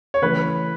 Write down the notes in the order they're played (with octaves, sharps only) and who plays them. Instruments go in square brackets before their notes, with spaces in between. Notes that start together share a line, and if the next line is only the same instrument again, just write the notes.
[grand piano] C#5
[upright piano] C#3 E3 A3 C#4 [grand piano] B4